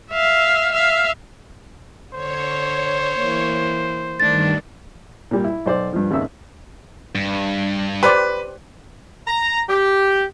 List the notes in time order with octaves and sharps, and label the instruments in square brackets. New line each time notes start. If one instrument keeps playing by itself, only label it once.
[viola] E5 F5
E5 F5
[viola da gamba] D3 [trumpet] C5 [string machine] C#5
[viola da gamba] E3 A#3
[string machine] G2 D#3 [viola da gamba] A3 D4 [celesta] A6
[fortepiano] A#2 G3
E4
B1 C5 D5
G2 F3
G#1 D#2 C#3 E5 E6
[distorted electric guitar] G2
[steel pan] G4 C5 D5 [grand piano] B4
[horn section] A#5
G4